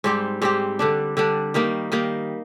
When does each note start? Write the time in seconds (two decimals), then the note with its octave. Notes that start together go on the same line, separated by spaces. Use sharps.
0.04 G#2 G3 C4 G4
0.42 G#2 G3 C4 G4
0.79 D3 G3 D4
1.17 D3 G3 D4
1.54 D#3 G3 A#3 D#4
1.92 D#3 G3 A#3 D#4